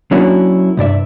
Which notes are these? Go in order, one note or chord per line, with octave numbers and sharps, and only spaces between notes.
F#3 A#3 C#4 D4 E4 F#4
C2 G2 D5 E5